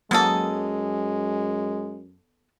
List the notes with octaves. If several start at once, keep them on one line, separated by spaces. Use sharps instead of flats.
F#2 F#3 G#3 A#3 B3 A4 D#6